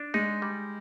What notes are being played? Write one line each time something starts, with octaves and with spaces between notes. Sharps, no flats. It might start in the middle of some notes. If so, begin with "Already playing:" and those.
Already playing: D4
G#3 D#4
G3